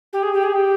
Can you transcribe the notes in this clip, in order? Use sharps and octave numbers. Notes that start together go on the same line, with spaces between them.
G4
G#4
G4
G#4
G4